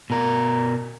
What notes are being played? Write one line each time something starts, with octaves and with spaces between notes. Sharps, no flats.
B2 A#4